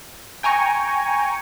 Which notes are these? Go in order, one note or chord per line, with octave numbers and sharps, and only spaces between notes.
G5 G#5 A#5 C#6